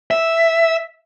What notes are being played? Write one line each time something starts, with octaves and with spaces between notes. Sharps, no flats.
E5